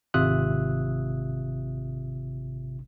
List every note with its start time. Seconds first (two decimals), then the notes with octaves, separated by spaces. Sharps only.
0.14 G#1 C3 F4 E5 D#6 F#6